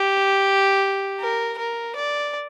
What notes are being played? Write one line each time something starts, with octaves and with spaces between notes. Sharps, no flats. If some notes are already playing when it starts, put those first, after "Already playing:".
Already playing: G4
A#4
A#4
D5